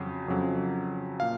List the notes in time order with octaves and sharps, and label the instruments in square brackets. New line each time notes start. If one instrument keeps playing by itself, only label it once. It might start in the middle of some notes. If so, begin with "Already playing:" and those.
Already playing: [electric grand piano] F2 C#3 F#3
F2 C#3 F#3
A#2 F5